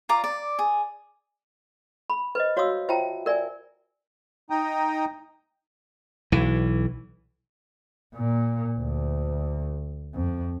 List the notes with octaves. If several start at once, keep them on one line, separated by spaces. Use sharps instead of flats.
F4 D5 A#5 D6
D5
G#4
B5
B4 C5 D#5
F#4 C#5 F5 C6 D#6 E6
F4 C5 E5 G5 A5 A#5
A#4 D5 E5 G#5
D#4 G5 A#5 D#6
B1 E3
A#2
D2
F2